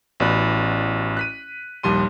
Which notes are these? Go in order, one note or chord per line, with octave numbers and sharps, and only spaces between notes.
A1 B3 F#4 D5 B5 F#6
F#6 B6 D#7
A#1 D#2 G3 C6 D#7